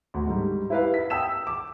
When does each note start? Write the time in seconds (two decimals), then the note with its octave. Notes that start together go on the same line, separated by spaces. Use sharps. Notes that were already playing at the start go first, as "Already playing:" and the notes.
0.14 D2
0.27 G#2 G3
0.70 E4 G4 B4 E5 F5
0.94 B6
1.10 G5 D#6 E6 B6 E7
1.47 D6